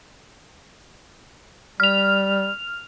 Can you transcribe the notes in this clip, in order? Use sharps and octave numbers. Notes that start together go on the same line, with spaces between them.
G3 F6 F7